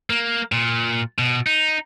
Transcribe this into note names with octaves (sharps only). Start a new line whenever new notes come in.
A#3
A#2
B2
D#4